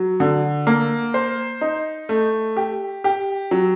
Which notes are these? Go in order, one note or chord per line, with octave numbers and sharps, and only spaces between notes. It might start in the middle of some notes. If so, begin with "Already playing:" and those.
Already playing: F#3
D3
A#3
C5
D#4
A3
G4
G4
F#3